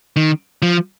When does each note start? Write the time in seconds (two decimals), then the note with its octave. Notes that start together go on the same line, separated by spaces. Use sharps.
0.16 D#3
0.62 F3